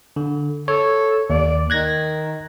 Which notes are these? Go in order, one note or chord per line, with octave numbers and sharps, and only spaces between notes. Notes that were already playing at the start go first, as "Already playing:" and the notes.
D3
A4 C#5
D#2 D5
D#3 F#6 G#6 A#6